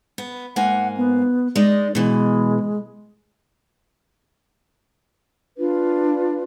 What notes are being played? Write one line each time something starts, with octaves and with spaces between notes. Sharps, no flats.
B3
G#2 A#3 F#5 G#5
B3
G#3 D#4 D5
B2 E3 G#3
D4 F4 B4